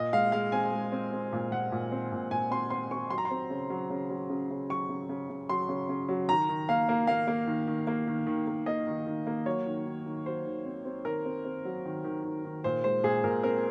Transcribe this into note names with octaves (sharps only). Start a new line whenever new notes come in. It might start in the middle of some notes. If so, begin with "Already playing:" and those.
Already playing: A#2 D#5
G#3 F5
G#3 F5
C4 G#5
G#3
C4
C4
A#2
A#2 F#5
A#2
C4
A#2
A#2 G#5
C4 C6
C4 C6
C4 C#6
F#3 C6
A#5
C6
C4
C#3
F#3
C#3
F#3
C#3
C#3
F#3 C#6
C#3
C#3
C#3
F#3 C6
C#3
C#3
F#3
D#3 A#5
D#3
A#3 F5
A#3
A#3 F5
A#3
D#3
D#3
A#3
D#3
D#3
A#3
A#3 D#5
D#3
D#3
A#3
F#3 C#5
D#3
D#3
D#3
F#3 C5
D#3
C4
C4
D#3 A#4
C4
C4
F#3
D#3
D#3
D#3
D#3
A#2 C5
G#3 C5
A#2 G#4
A#2 A#4
C4 A#4